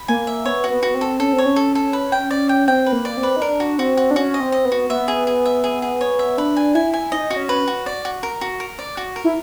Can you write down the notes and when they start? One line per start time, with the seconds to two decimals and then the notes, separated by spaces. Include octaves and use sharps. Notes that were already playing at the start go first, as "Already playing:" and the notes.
Already playing: B5
0.08 A#3 G#5
0.27 E5
0.45 B3 C#5
0.64 F#4
0.70 B3
0.83 F#4
0.95 C4
1.01 A4
1.20 C#4 A4
1.33 C4
1.38 C#5
1.46 C#4
1.56 A4
1.75 A4
1.93 B4
2.12 G5
2.31 D5
2.49 G5
2.68 C4 G5
2.86 B4
2.92 A#3
3.05 D5
3.17 C4
3.23 B4
3.36 D#4
3.42 D4 A#4
3.60 F#4
3.79 C4 F#4
3.97 F#4
4.11 D4
4.16 C#4 F#4
4.34 D#5
4.40 C4
4.52 D#5
4.65 B3
4.72 F#4
4.90 B3 E5
5.08 G#4
5.27 G#4
5.45 E5
5.64 G#4
5.82 G#4
6.01 C#5
6.19 E5
6.38 D4 B4
6.56 G#5
6.75 E4 G#5
6.94 G#5
7.12 D#4 D#5
7.30 F#4
7.37 C#4
7.49 B4
7.68 F#4
7.86 D5
8.05 F#4
8.23 A#4
8.41 F#4
8.60 A#4
8.79 D5
8.97 F#4
9.16 A#4
9.24 E4